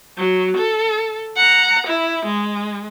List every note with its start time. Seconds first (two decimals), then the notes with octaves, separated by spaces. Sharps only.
0.18 F#3
0.57 A4
1.36 F#5 A#5
1.88 E4
2.26 G#3